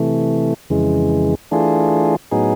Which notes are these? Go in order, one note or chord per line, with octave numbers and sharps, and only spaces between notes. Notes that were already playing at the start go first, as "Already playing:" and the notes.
Already playing: C3 E3 A3
F2 C#3 E3 G#3
E3 A3 D4 F4 G#4
A2 F#3 B3 D#4 G#4